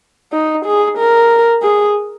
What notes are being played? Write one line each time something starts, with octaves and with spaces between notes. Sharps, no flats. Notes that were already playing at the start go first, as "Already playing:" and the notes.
D#4
G#4
A#4
G#4